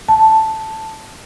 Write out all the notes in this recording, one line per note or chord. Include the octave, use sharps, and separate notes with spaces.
A5